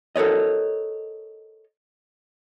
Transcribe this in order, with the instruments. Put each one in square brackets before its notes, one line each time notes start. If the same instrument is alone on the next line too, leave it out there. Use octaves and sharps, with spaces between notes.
[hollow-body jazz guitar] A4 A#4 C#5 D#5